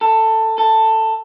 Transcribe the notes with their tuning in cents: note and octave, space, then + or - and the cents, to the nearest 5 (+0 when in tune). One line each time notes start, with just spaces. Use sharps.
A4 +15
A4 +10